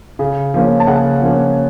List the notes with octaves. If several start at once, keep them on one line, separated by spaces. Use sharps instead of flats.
C#3
F3 A#3 C#4
A5
C#3 F#5
F3 A#3 C#4